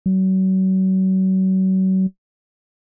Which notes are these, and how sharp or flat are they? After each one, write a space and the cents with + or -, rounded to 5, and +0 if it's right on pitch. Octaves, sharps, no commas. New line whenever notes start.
F#3 +35